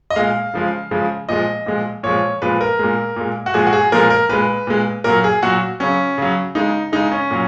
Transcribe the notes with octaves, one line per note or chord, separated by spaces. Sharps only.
D#5
A#2 G#3 F5
C#3 F3 G#3
C#3 F3 G#3
A#2 F3 G#3 D#5
A#2 F3 G#3
A#2 F3 G#3 C#5
A#2 F3 G#3 B4
A#4
A#2 G#3
A#2 G#3
F#4
A#2 F3 G#3 G#4
F#4
G#4
A#2 F3 G#3 A#4
A#4
A#2 G#3 B4
A#2 G#3
A#2 F#3 A#4
G#4
A#2 F#3 F#4
C#3 F#3 C#4
C#3 F#3
C#3 G#3 D#4
C#3 G#3 D#4
C#4
A#2 F#3